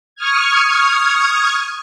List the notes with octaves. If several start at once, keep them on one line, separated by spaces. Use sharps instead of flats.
C#6 D#6 F6 G#6